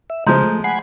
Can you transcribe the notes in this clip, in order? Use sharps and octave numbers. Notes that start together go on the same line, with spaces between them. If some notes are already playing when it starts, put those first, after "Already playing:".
E5
C#3 F3 G#3 A#5 C6 G6
A3
F#5 G#5 B5 C7